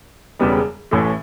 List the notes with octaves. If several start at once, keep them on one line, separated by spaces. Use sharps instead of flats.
E1 E2 C#3 G3 B3
A1 A2 E3 A3